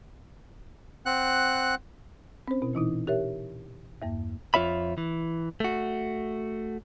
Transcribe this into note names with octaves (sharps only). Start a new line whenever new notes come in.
C4 F#5 F#6
C4 C#4 C5
B2 E4
A#2 E3 D#4 E4
G4 A#4 C#5 E5
E2 G2 A#3
F2 F4 C#5 E5 B5
E3
A3 F#4